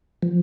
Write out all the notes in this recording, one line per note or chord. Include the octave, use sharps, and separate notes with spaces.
F3